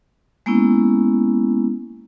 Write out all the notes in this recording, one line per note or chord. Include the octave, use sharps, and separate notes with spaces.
G#3 A#3 B3 C#4 E4